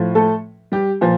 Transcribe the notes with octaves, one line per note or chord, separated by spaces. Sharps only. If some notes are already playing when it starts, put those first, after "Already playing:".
Already playing: A2 F3
A3 A4
G3 G4
A#2 F3